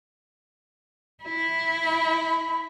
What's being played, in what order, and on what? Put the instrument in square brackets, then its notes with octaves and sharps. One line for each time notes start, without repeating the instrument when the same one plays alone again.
[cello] E4
[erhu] B5